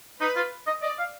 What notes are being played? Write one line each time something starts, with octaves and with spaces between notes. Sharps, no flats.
D#4 B4
F4
D#5
D5 D#5
F5